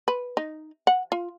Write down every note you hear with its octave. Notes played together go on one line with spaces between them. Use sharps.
B4
D#4
F#5
F4